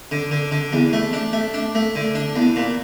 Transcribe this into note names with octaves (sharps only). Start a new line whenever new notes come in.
D3
D3
D3
E2
A3
D4
A3
D4
A3
D3
D4
E2
A#2